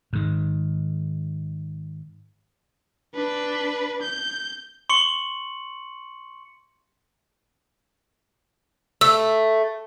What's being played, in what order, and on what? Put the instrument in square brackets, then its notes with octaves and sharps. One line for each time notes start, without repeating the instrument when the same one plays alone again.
[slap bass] G#2 D#3
[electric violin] D4 B4
G6
[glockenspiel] C6 C#6 C#7 F#7
[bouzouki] A3 [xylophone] E6